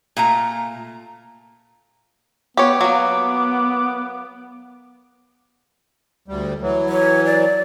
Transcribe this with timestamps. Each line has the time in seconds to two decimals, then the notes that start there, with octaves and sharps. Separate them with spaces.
0.17 A#2 A3 A#5
2.57 B3 G4 C#5 D6
2.81 F#3 A#3 B3
6.28 D2 G3
6.62 E3 F#3
6.89 C#5
7.26 D5